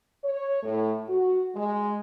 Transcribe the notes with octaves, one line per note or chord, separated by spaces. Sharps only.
C#5
A2
F#4
G#3